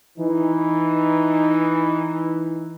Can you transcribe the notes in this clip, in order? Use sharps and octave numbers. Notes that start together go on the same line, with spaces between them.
E3 D#4